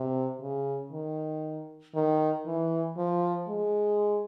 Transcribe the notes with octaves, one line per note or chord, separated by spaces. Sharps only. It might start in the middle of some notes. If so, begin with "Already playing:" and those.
Already playing: C3
C#3
D#3
D#3
E3
F3
G#3